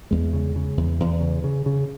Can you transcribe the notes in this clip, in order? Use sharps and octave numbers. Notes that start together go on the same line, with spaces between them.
E2 G#3
C#3
C#3
E2
E2
C#3
C#3
C#3